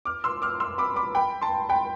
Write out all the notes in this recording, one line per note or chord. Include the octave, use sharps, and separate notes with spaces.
D6 F6
C6 E6
D6 F6
C6 E6
B5 D6
B5 D6
G5 B5
A5 C6
G5 B5